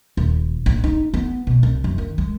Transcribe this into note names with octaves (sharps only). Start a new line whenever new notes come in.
D#1
A#1
D#4
B3
B2
C2
F#2
D#3
G#3